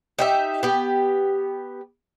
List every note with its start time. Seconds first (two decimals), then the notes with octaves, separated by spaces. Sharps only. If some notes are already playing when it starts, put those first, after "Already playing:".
0.19 D#4 G4 E5
0.63 B3 G4